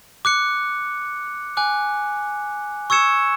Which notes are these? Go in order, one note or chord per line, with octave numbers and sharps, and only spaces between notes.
D6 F#6 C#7
G#5 D6 F#6
C#6 E6 G#6 C#7 E7